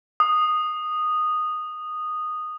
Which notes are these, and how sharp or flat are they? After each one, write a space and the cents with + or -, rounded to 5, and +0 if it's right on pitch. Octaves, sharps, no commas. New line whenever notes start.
D#6 -10